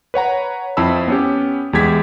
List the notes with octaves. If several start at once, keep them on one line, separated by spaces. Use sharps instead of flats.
B4 C#5 F#5 A#5
F2 C4 E4 A5 B5 E6
B3 C#4 G4
E2 G#3 G4 G#6 B6